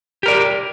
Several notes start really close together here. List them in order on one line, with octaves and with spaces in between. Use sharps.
G4 A#4 D5